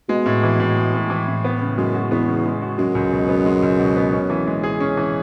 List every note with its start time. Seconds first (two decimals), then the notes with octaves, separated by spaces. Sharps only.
0.09 B2 G#3
0.26 A2
0.43 E3
0.60 A2
0.76 G#3
0.94 A2
1.10 E3
1.28 A2
1.45 B3
1.61 C#3
1.78 F#2 G#3
1.94 F#4
2.11 E2 B3
2.28 C#3
2.45 G#3
2.62 F#4
2.78 F#2 G#3
2.95 C#2
3.13 B2
3.29 B3
3.46 G#3
3.63 C#2
3.79 B2
3.96 B3
4.13 C#4
4.30 E3
4.47 G#3
4.63 G#4
4.80 C#4
4.97 E3